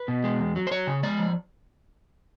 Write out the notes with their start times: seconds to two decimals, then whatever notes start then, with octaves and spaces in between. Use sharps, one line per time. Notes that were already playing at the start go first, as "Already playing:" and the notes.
Already playing: B4
0.08 B2
0.24 G#3
0.40 E2
0.56 F#3
0.67 C5
0.71 F#3 C#5
0.87 C#3
1.03 G#3 D5
1.19 F3